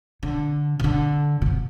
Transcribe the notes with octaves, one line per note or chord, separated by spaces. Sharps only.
D3
C3
D3
A#2
C3